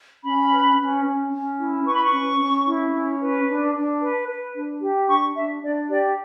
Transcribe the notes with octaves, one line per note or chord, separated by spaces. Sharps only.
C#4 B5
B4
C#4
C#4
C#4
E4
B4 C#6
B5
C#6
C#4
C#4
E4
C#4
B4
D4
D4
B4
B4
D4
G4
D4 C#6
D4 E5
D4 D5
G4 D5